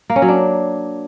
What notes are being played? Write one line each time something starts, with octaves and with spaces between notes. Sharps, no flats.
A#3
C#4
F#3
D4